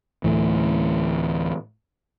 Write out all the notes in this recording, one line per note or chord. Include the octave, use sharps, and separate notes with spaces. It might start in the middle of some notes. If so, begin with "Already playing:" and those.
D2 A2 E3